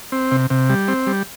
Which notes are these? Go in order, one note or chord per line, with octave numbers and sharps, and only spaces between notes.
C4
C3
C3
G3
C4
G3